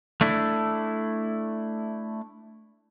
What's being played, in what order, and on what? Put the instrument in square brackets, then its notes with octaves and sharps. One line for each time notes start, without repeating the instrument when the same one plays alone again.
[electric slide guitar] A3 D4 E4